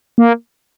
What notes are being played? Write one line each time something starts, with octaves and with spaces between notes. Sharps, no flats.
A#3